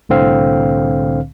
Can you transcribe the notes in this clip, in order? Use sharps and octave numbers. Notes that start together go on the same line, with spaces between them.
C2 A2 D3 C4 F5